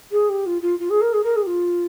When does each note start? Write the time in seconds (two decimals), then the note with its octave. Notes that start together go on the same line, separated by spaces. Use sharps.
0.11 G#4
0.29 G4
0.46 F4
0.61 F4
0.79 F4
0.89 G#4
1.01 A#4
1.13 G#4
1.23 A#4
1.36 G#4
1.42 G4
1.46 F4